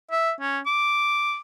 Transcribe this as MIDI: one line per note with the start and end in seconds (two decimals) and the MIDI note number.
0.11 0.32 76
0.41 0.59 61
0.66 1.39 86